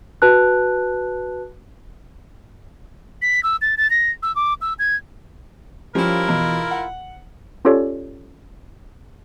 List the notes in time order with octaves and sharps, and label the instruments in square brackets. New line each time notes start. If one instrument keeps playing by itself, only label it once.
[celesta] F#4 B4 A5 F#6
[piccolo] B6
E6
A6
A6
A#6
E6
D6
E6
G#6
[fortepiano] F3 G3 C#4 [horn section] E4 F4 A#4
[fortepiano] E2 B2
F#5
[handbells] C#4 F4 G4 A4 C#5 D5